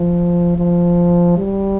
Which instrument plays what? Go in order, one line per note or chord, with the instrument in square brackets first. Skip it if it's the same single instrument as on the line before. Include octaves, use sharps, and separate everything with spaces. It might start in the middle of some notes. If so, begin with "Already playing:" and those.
Already playing: [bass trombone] F3
F3
G3